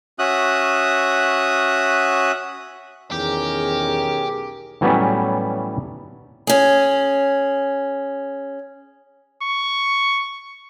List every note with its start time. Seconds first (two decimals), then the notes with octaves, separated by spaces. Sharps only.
0.19 C#4 F#4 E5 D#6 F#6
3.12 B1 E2 D#3 C#4 G4 G#4 A#4
4.81 A2 E3 F#3 G3 B3 C#4
6.47 C#4 G#4
9.43 C#6